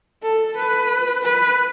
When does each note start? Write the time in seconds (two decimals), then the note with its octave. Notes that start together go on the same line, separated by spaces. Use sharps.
0.23 A4
0.57 B4
1.24 B4